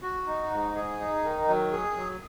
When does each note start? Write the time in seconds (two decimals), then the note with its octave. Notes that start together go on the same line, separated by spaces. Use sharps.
0.02 F#4
0.27 D#4
0.50 G#2
0.75 G#4
1.00 D#4
1.24 D#3
1.48 F#3
1.72 G#4
1.96 F#3